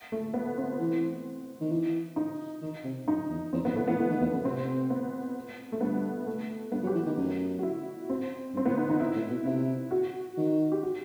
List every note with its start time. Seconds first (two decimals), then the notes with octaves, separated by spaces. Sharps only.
0.12 A3
0.34 B3
0.58 C4
0.79 E3
1.61 D#3
1.72 E3
2.16 D#4
2.62 D#3
2.85 C3
3.07 F#2 D#4
3.30 E2
3.53 E2 C4
3.65 F#2 B3
3.75 A2 A3
3.87 E3 B3
3.99 E3 A3
4.10 D#3
4.21 E2 B3
4.33 F#2
4.45 C3 C4
4.90 B3
5.72 A3
5.81 G2 B3
6.27 A3
6.72 G2 B3
6.83 F#3
6.87 G4
6.95 E3
7.07 D#3
7.18 F#2
7.59 F#4
7.63 E4
8.10 C4
8.54 G2
8.57 C4
8.65 A2 B3
8.77 D#4
8.89 D#3 D#4
9.00 E4
9.15 A2
9.30 B2
9.45 C3 E4
9.91 F#4
10.38 D#3
10.72 G4
10.83 F#4